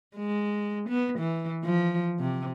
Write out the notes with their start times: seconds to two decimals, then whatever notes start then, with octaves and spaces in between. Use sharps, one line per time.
0.17 G#3
0.89 B3
1.19 E3
1.64 F3
2.20 C3